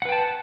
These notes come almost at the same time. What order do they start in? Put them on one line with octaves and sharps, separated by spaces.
F#5 B4 G5 A5